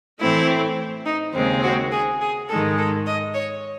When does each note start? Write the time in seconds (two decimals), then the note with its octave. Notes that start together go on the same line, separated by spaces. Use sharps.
0.20 A2 E3 A3 C4 E4
1.06 D#4
1.34 D#2 C#3 G#3 C4
1.63 F#4
1.92 G#4
2.21 G#4
2.49 G#2 D#3 G#3 A4
2.78 A4
3.07 D#5
3.35 C#5